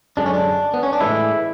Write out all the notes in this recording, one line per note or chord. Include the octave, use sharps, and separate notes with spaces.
F#2 D3 G#3 D4
C#4
D4
B3
C#4
D4
A2 E3 G#3 E4